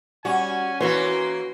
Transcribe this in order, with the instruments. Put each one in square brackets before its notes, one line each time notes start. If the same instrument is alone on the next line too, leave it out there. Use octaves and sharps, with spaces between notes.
[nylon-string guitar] G3 [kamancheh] C#4 [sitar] F#4 [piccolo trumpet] G#5
[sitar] E3 A#3 [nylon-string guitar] F#4 B4 C#5 [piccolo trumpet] C6